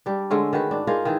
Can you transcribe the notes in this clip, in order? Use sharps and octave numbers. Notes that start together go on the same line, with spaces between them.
G3 D4
D3 G#3 A3 C#4
D#3 F#4 B4
G#2 D4
D#4 F4 G#4 A#4
D#3 E3 G#4